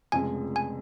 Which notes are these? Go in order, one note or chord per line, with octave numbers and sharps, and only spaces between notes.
F1 F2 C#3 G#3 G#5
G#5